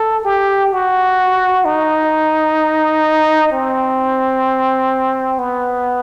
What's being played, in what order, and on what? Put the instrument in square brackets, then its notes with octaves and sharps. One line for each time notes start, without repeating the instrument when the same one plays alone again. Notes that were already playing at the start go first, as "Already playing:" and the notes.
Already playing: [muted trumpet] A4
G4
F#4
D#4
C4
B3